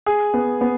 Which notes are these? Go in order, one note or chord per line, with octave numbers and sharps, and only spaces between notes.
G#4
B3
B3